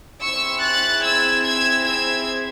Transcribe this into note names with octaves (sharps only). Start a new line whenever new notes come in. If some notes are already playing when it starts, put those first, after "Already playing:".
C4 E4 G#4 C#6 E6
F#6 A6
E6 G#6
E6 G#6
E6 G#6